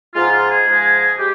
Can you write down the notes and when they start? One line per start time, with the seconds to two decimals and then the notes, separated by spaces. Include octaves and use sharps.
0.14 G#2 F3 G#3 F4
0.32 F4
0.49 G#4
0.67 G#2 F3 G#3
1.18 G#3 G4